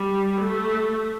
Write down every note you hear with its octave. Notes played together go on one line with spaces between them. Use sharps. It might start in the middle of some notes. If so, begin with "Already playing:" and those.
Already playing: G3
A3